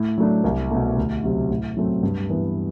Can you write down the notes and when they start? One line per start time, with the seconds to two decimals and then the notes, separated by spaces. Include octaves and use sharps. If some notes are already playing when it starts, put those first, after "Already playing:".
Already playing: A2
0.18 F#3 A3 D4
0.44 C2
0.71 B2 A3
0.97 D2
1.24 C3 F#3
1.50 A2
1.77 F#3 A3 C4
2.03 G2
2.30 E3 B3